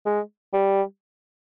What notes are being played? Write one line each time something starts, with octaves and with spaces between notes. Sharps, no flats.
G#3
G3